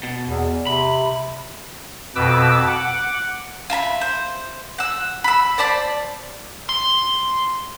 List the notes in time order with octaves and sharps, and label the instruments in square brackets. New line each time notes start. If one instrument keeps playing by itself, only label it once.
[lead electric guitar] B2
[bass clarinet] E2
[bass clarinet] C3 [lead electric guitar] B5
[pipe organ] F2 B2 B4 D6 E6
F#5 D6
[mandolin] F4 E5 A#5 B5
C5
F#5 E6
B5 E6
C5 D5 A5 B5
[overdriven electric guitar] C6